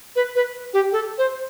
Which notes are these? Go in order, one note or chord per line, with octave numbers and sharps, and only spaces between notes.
B4
B4
G4
A4
C5